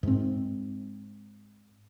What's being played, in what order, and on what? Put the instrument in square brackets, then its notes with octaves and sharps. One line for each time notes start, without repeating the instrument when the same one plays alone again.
[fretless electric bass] G#2 C4